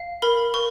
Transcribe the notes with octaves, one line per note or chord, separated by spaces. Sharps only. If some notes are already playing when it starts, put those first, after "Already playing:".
Already playing: F5
A#4 B5
A#4 C#6